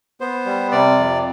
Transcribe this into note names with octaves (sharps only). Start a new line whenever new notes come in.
B3 C5
G3
C3 D5
F2